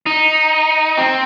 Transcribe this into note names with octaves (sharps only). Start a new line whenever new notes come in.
D#4
C4